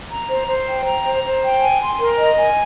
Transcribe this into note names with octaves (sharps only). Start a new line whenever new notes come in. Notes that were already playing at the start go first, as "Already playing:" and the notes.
A#5
C5
C5
G5
A#5
C5
C5
G5
G#5
C6
A#4
D#5
G#5